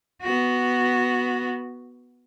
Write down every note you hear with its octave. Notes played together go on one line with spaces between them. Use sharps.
B3 F#4